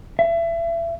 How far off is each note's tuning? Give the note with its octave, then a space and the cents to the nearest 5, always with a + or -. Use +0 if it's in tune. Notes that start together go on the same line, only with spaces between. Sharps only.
E5 +30